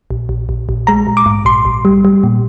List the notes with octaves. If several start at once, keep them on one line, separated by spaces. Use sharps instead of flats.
A#1
A#1
A#1
A#1
G#3 A#5
A#1
D6
G#2
A#1 C6
A#1
G3
G3
A#2